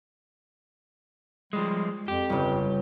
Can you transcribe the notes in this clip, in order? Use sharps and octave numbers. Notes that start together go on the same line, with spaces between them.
F3 G3 G#3
F2 G4
G1 C#3